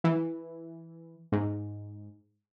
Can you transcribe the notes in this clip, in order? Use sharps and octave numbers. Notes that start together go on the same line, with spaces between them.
E3
G#2